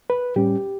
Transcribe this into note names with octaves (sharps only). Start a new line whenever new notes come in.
B4
A2 G3 C#4 G4